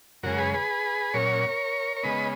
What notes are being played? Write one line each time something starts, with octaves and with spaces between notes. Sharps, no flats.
F#2 C#3 G#3 F#4 A#4
G#4 B4
G#4 B4
A#2 F#3 C#4 A#4 C#5
C#5
C#3 G#3 B3 B4 D#5